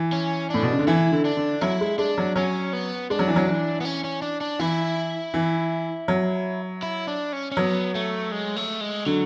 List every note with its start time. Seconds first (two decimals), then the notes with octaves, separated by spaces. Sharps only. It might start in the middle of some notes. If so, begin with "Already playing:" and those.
Already playing: E3
0.13 C#4
0.50 A2 D4
0.63 B2
0.71 C#3
0.79 D3
0.87 E3 E4
1.12 D3
1.25 D4
1.37 D3
1.61 F#3 E4
1.81 G#3
1.98 G#3 D4
2.18 F#3
2.36 F#3 C#4
2.73 B3
3.10 G#3 D4
3.19 F#3
3.28 E3
3.36 F#3
3.48 E3
3.81 B3
3.85 C#4
4.04 C#4
4.22 D4
4.41 D4
4.59 E3 E4
5.34 E3
6.08 F#3
6.83 E4
7.07 D4
7.33 C#4
7.52 C#4
7.57 F#3 B3
7.95 A3
8.32 G#3
8.56 A3
8.81 G#3
9.06 D3 F#3